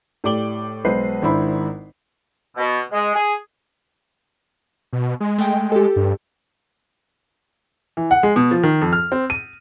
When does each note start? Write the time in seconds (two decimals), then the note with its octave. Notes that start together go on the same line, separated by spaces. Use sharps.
0.24 A2 G4 D5 D6 F#7 G7
0.85 B1 G#3 B4 C5 D#5 C7
1.22 G#1 G#2 D4 E4 C5 B5
2.57 B2
2.92 G#3
3.15 G#4
4.93 B2
5.20 G#3
5.38 A3 G5
5.72 G4 A4
5.96 G2
7.97 E3
8.11 F#5
8.23 G#3
8.36 B2
8.51 F3
8.63 D#3
8.81 F2
8.93 F6
9.12 C4
9.30 D#7